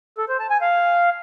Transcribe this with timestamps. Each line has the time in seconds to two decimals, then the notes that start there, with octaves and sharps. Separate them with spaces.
0.18 A4
0.29 C5
0.40 A5
0.50 G#5
0.61 F5